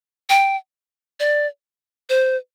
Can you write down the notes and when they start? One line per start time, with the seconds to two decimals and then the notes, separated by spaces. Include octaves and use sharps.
0.30 G5
1.20 D5
2.09 C5